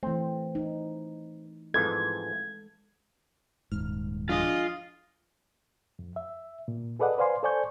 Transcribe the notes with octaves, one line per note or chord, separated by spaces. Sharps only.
E3 A3 C4
D#4
F2 G#2 E3 G#3 A4 G#6
D#1 G#2 F6
F3 D4 F4 G#4 D#5
F2
E5
A#2
G#4 A4 B4 D5 D#5 F#5
B4 C5 D5 F5 G#5 C6
A4 C5 D5 G#5 C#6 G6